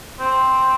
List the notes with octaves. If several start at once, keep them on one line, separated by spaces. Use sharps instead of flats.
C4